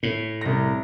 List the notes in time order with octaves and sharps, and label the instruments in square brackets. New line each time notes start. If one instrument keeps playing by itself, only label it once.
[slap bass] A2
[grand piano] C2 A#6